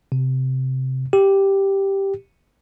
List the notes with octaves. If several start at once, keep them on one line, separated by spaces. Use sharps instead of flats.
C3
G4